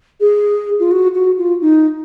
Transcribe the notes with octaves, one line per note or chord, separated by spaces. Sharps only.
G#4
F4
F#4
F#4
F4
D#4